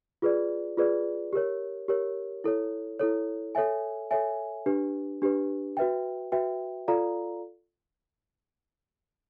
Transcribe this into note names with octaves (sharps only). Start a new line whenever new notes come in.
F4 G#4 B4 D5
F4 G#4 B4 D5
G4 A#4 C#5
G4 A#4 C#5
E4 A4 C#5
E4 A4 C#5
A4 C#5 E5 G#5
A4 C#5 E5 G#5
D4 G4 B4
D4 G4 B4
F#4 B4 E5 G5
F#4 B4 E5 G5
F4 A4 D5 F5 A#5